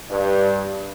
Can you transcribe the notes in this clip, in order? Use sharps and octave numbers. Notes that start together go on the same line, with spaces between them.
G2